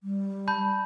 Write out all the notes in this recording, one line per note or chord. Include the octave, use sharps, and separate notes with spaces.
G3
A5 B5 G6